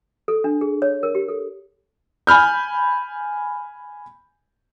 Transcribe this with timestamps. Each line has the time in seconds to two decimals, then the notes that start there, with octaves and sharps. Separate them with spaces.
0.28 A4
0.44 D4
0.61 G#4
0.82 C#5
1.03 A#4
1.15 G4
1.28 A4
2.27 G#5 B5 F6 G6